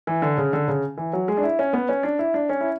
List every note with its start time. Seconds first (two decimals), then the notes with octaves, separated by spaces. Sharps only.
0.07 E3
0.22 D3
0.38 C#3
0.53 D3
0.68 C#3
0.97 E3
1.13 F#3
1.28 G#3
1.37 D4
1.43 E4
1.59 C#4
1.73 B3
1.89 C#4
2.03 D4
2.19 E4
2.34 D4
2.49 C#4
2.61 E4